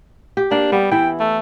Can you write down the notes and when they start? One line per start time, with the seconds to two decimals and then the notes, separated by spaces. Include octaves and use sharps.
0.37 G4
0.51 A#3 D4
0.72 G3 B3
0.91 E3 E4 G5
1.20 A3